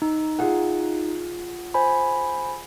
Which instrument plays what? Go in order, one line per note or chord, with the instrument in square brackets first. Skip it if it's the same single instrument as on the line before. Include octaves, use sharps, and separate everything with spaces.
[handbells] D#4
[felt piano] F4 G#4 F#5
[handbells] C5 G#5 B5